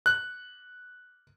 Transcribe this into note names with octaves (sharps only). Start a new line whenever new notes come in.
F#6